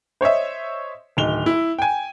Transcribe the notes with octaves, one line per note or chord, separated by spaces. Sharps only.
C5 C#5 D#5 E5
D1 D#3 F7 G7
E4
G5 G#5